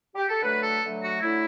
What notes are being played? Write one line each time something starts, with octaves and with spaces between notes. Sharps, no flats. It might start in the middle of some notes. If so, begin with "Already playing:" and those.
G4
A4
D3 F#3 A3 B4
A4
D3 F#3 A3
F#4
D3 F#3 A3 E4